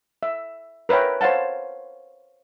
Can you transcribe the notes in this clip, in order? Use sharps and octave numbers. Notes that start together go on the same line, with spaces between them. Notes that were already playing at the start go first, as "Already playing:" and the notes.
E5
A#4 B4 C#5 E5 G5
C5 C#5 F5 F#5 A5